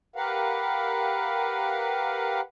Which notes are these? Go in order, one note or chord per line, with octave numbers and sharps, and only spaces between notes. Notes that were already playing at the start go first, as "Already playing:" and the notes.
G4 A#4 B4 F5 F#5